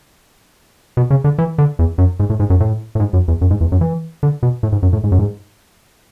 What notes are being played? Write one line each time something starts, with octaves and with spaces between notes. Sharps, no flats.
B2
C#3
D3
E3
D3
E2
F#2
G#2
A2
G#2
F#2
A2
A2
G#2
F#2
E2
F#2
G#2
E2
F#2
E3
D3
B2
A2
G#2
F#2
A2
G#2
F#2
G#2